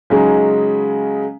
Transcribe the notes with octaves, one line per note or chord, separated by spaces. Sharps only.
C#3 F#3 G#3 C#4 D#4